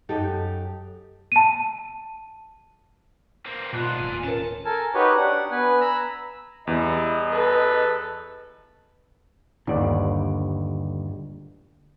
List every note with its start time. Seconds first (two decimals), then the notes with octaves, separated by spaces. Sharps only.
0.09 F#2 D#4 G4 A4
1.32 A5 D#7
3.46 A#3 C4
3.73 G#2 B2 D4 F4 F#6
3.97 D1 A1 D#2 A#2 G#5
4.24 C#4 A#4 A5
4.65 A4 A#4 G#5 A5
4.94 D#4 F#4 G4 B4 C#5
5.17 D4 F#5
5.51 B3 B4 G#5
5.81 A#5 B5 E6
6.67 E2 G3 E4 D#5
7.31 A4 B4
9.67 G1 D#2 D3 D5